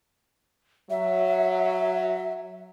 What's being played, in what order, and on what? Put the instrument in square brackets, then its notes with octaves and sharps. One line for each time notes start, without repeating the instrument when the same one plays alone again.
[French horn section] F#3 [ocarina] E5